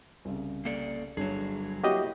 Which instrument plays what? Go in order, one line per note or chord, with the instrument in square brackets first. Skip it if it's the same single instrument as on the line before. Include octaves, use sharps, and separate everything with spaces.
[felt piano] C2 C#3
[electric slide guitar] A#3 A4 D5
[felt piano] G1 D4 C#5 [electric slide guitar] F#3 G#4
[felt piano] A#3 E4 C#5 [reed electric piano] F#4 G4 D#5